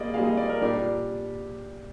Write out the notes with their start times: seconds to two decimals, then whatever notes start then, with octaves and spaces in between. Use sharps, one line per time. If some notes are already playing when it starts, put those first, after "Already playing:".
Already playing: G3 A#3 F4 G#4 D5 D#5
0.14 G3 A#3 F4 G#4 F5
0.25 D#5
0.37 D5
0.49 A#4
0.61 A#2 G3 D4 G4 D5